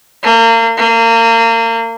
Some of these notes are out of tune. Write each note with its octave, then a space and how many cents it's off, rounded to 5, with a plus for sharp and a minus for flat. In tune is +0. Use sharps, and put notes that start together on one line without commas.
A#3 -35
A#3 -30